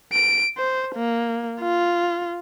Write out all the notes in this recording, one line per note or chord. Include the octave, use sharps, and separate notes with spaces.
D7
C5
A#3
F4